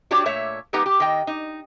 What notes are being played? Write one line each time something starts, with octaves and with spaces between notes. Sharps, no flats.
D4 F#4 G4 C#5 D5
A#2 A3 C#5 E5
G#3 B3 D#4 G4 B4 F#5
G4
D#3 D#5 G5
D#4